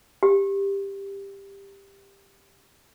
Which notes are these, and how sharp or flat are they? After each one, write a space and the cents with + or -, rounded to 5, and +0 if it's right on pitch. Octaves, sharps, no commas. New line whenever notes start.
G4 +10